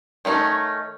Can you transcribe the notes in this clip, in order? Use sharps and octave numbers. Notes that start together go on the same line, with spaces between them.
D#3 A3 C#4 D#4